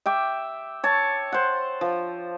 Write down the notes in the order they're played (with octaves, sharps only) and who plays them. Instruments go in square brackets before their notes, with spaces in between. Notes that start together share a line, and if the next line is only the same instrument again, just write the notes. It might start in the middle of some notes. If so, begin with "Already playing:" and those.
[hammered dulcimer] E5 G5 D6
C#5 A5
C5 F#5
F3